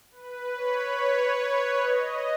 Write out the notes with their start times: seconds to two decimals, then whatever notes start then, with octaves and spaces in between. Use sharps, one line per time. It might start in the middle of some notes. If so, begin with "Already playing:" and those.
0.12 B4
0.54 C#5
1.81 D#5